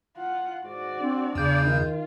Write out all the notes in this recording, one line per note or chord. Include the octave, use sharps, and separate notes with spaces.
F4 F#5
G#2 F#4 D5
C4 D4
E2 C#3 D5 F5 G6
D#3 F4